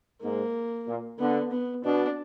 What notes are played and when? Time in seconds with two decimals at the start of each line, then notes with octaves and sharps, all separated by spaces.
0.21 G#2 A#3
0.87 A#2
1.19 D3 B3
1.51 B3
1.84 B2 D4